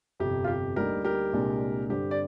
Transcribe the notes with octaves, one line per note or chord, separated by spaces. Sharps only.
G1 F2 C3 G4
F4
G4
D2 D3 G3 A#3 D#4 G4 A#4
G4 A#4
C2 A#2 G#3 D4
G2 D3 G3 C4 G4
D5